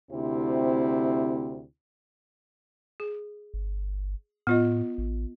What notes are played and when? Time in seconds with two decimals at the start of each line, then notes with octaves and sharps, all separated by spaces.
0.11 D2 C3 C4 E4
3.00 G#4
3.54 G1
4.47 A2 B3 F4 D#5
4.98 A1